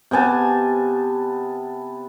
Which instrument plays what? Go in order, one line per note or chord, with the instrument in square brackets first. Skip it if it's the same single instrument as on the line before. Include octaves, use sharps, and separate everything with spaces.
[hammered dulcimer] C3 B3 G#5 A5